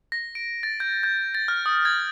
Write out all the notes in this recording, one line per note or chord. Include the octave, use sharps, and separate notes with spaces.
A#6
D7
A6
G6
G6
A6
F6
D#6
G#6